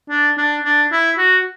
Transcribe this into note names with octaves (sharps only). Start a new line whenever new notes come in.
D4
D4
D4
E4
F#4